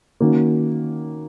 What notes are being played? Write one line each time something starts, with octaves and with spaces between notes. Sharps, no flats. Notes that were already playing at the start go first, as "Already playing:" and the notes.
D#3 A#3 C#4 F#4